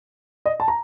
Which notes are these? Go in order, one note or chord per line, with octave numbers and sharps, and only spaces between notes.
D#5
A5
A#5